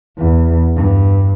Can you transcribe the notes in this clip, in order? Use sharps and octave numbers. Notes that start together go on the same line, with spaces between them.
E2
G2